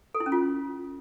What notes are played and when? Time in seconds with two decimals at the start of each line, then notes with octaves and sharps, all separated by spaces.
0.15 A4
0.20 E4
0.26 C#4
0.32 F4